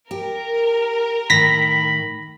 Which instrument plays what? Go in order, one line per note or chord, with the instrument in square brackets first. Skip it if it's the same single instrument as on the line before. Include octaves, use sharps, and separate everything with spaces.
[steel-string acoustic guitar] G4 [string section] A#4
[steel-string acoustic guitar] A2 D#3 [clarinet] B5 [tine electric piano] A#6 B6